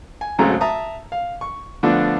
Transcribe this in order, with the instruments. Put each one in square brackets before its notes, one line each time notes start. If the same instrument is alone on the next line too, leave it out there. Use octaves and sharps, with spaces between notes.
[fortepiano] G#5
G#1 C#3 F#3 G#3 A3 A#5
E5 A5 A#5 D#6
F5
C#6
D3 F3 A3 B3 D4